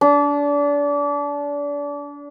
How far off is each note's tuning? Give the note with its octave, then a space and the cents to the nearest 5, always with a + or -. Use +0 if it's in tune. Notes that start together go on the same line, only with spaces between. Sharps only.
D4 -30